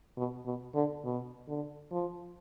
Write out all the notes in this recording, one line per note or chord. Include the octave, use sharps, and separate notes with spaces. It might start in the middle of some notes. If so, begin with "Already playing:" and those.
B2
B2
D3
B2
D3
F3